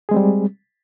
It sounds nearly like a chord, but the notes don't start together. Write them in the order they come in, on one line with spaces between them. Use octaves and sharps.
G#4 G#3 C4 G3